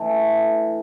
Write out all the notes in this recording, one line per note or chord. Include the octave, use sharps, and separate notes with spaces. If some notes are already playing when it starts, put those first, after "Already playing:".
Already playing: E3 A3 D4